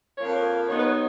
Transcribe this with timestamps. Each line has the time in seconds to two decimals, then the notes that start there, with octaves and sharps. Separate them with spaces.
0.18 F2 F3 A#3 C#5
0.35 A#4
0.52 F5
0.68 D#2 D#3 F#3 B3 D#4 C#5
0.78 B4
0.86 C#5